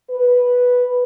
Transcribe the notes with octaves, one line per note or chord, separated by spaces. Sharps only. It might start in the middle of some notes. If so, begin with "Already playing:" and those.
B4